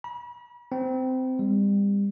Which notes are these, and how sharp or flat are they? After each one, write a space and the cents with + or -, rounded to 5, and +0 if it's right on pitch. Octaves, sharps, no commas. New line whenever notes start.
B5 -40
C4 -20
G3 +35